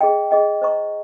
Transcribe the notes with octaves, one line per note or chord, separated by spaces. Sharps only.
G#4 D#5 G5
G#4 D#5 G5
C5 D#5 A#5 C#6